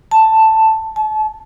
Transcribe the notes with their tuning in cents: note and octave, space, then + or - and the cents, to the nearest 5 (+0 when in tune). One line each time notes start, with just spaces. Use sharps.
A5 +5
A5 -35